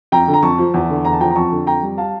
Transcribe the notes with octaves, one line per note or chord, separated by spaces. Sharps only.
F2 G5 A#5
D3
A#5
F2 A5 C#6
F3
E2
D3
E2 A#5
A5
F3 G5 A#5
A#5
F2 A5 C#6
D3
F2 G5 A#5
G3
F5 A5